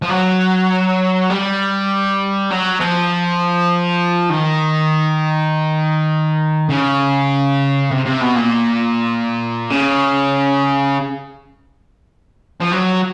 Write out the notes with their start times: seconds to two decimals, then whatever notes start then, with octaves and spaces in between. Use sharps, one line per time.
0.02 F3
0.09 F#3
1.30 G3
2.51 F#3
2.80 F3
4.30 D#3
6.70 C#3
7.91 C3
8.05 C3
8.21 B2
8.36 A#2
9.70 C#3
12.61 F3
12.71 F#3